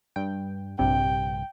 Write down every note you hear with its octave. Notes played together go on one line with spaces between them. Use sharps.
G2 G5
A#1 G2 C3 G5